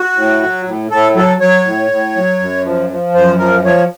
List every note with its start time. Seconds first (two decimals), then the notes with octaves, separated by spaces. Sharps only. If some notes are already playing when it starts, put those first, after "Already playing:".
Already playing: F#4
0.16 A2
0.42 F#3
0.66 A2
0.91 A2 A4
1.15 F#3 A4
1.41 F#3 C#5
1.66 A2
1.91 A2
2.16 F#3
2.40 F#2
2.65 F3
2.90 F3
3.14 F#2 C5
3.39 F3 A#4
3.64 F3 C#5